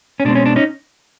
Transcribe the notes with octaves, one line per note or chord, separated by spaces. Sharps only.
C#4
B2 G#3 C4 D4
C#4
D4
C#4 D#4